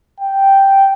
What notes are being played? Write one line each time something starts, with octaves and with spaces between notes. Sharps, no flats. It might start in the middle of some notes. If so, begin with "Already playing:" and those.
G5